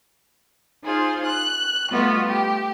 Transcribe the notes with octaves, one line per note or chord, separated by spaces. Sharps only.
D#4 F4 G#4 C5
F#6
G3 A3 B3 F4 F#4 D#5
A3 G4